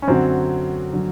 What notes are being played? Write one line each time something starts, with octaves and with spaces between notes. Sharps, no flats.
C#4
F#2 D3 F#3 C4
D3 F#3